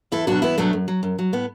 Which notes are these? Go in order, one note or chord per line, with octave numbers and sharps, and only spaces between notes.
E2 E4 A4
B2 F#3 D4 F#4
E2 B3 E4
B2 F#3 A3 D4
F#2
F#3
F#2
F#3
A2 B3